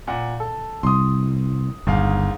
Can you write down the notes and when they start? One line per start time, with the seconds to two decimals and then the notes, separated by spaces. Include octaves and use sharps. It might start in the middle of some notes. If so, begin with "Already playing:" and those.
0.07 A#2 F#5
0.40 A4
0.83 C2 C6 D#6
1.87 G1 D#2 G#2 F5